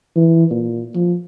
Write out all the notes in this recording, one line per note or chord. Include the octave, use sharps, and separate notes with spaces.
E3
A#2
F3